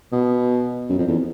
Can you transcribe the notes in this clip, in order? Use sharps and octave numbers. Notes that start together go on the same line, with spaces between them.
B2
F#2
F2
E2